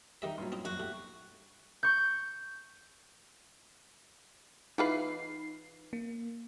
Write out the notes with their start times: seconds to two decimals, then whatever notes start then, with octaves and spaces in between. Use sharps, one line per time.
0.22 D#3 G3 D#4 D#5 E5
0.38 G2 A#2 F#3
0.52 C4 D#4
0.65 F#2 F#4
0.80 A2 G4
1.83 C#6 G6
4.78 E3 D#4 F4 B4 C7
5.93 A#3